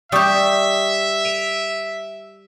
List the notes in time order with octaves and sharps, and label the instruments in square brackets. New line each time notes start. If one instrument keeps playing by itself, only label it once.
[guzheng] G3 G4 [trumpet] E5 [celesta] G5 C#6 D#6
[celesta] D7 D#7 F7